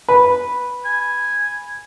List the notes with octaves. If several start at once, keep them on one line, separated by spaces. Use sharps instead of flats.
B4
G#5